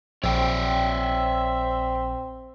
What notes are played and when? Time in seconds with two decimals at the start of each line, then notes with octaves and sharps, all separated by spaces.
0.24 A#1 C4 C#5 D5 E5 G5